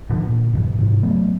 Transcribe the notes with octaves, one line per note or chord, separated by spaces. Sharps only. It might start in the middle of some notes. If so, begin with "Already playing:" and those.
B2 D3 D#3 F3
A#2
G2 C#3 E3
G#2 C3
F#3 A3 B3